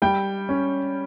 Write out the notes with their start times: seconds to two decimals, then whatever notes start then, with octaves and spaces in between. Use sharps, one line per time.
0.02 G3 G5
0.49 C#4